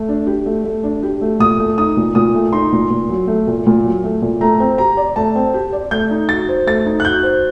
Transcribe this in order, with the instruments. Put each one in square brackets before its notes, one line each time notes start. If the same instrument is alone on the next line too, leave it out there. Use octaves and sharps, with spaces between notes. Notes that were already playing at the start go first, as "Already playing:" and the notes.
Already playing: [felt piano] A3
D4
G4
A3
A3
D4
G4
A3
[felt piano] A#2 [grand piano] D#6
[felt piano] A3
[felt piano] D#4 [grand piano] D#6
[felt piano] A#2
[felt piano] A#2 [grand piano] D#6
[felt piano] A3
[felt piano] D#4 [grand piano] C6
[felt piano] A#2
A#2
F#3
A3
A#2
A#2
F#3
A3
A#2
[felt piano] A3 [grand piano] A#5
[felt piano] C4
[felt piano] G4 [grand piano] A#5
[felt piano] D5
[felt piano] A3 [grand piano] A5
[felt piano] C4
G4
D5
[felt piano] A3 [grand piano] G6
[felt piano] D#4
[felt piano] F#4 [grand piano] A6
[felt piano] C5
[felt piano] A3 [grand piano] A6
[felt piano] D#4
[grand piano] F#6
[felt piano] F#4 [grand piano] G6
[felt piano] C5